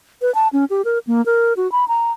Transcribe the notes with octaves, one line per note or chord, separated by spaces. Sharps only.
B4
A5
C#4
G4
A#4
A#3
A#4
F#4
B5
A#5